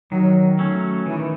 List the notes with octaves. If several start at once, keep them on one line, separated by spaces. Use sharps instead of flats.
D#3 F#3
F#3 A3 C#4
D#3 E3